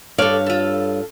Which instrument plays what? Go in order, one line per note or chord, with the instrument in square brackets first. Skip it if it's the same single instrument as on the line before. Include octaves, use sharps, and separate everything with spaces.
[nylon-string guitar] G2 C#5 F5 [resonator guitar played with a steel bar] A4 D5
[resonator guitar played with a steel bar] F4 A4